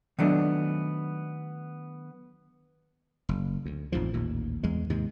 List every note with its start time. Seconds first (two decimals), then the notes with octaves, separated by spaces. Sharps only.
0.19 D#3 F#3 A3 B3 D4
3.29 F#1
3.66 D2
3.92 A1 F2 G#2 F3
4.13 A1 D#2 A#2
4.63 E2 G#3
4.90 D#2 G#2 C3 G#3